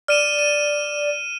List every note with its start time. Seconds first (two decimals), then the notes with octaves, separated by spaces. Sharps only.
0.08 D5 F6 D#7 E7
0.39 D#7